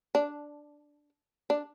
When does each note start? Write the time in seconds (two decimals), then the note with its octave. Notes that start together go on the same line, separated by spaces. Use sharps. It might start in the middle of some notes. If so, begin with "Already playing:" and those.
0.15 D4
1.50 D4